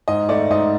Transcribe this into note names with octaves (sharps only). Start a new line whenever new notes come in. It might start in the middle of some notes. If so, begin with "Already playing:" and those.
G#2 D#5
A3 D5
G#2 D#5